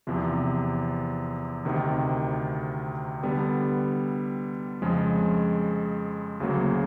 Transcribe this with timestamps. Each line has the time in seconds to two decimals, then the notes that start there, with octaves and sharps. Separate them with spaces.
0.07 E2 C3 F3
1.65 D2 C3 D#3
3.23 D3 G3 B3
4.82 F2 C#3 F3 G#3
6.40 D2 C#3 F#3 A#3